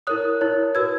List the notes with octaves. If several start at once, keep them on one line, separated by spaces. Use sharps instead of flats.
E4 A#4 C#5 D#6 F#6
E4 A#4 C#5
F#4 B4 E6 G#6